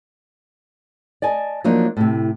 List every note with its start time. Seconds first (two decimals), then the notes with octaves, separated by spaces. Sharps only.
1.22 D5 D#5 G#5 A5
1.64 F3 F#3 A#3 D4 D#4
1.97 A2 C3